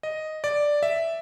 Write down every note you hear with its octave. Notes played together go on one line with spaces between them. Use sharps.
D#5
D5
E5